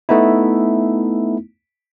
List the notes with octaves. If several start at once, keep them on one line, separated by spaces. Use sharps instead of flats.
A3 B3 D#4 E4